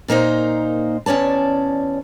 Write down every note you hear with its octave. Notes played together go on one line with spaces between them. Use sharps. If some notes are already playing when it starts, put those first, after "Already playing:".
A#2 A#3 D#4 C5
E2 C#4 C#5 D5 A5